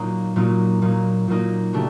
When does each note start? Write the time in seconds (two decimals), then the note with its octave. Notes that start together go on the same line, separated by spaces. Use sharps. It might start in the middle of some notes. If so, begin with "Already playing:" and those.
Already playing: A#2 F#3 A#3 D#4
0.36 A#2 F#3 A#3 D#4
0.82 A#2 F#3 A#3 D#4
1.28 A#2 F#3 A#3 D#4
1.73 C#3 F#3 A3 D4 G4